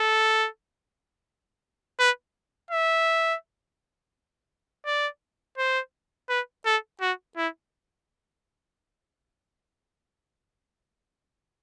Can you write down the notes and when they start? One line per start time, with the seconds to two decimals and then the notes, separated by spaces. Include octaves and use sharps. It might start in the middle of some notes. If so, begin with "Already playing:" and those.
Already playing: A4
1.99 B4
2.71 E5
4.86 D5
5.58 C5
6.29 B4
6.66 A4
7.01 F#4
7.37 E4